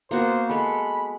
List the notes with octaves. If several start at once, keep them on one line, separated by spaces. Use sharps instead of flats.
A#3 B3 F#4 C5
G#3 A4 B5